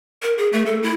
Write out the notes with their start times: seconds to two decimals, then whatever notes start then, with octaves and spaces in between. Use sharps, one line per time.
0.22 A#4
0.38 G#4
0.53 A3
0.66 A4
0.83 E4